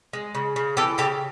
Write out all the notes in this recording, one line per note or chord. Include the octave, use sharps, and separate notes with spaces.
G#3
C#3
C#3
E3 G4 A4
C#3 G4 A4